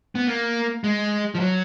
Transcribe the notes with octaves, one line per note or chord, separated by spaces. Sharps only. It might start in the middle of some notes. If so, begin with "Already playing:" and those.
B3
A#3
G#3
F3
F#3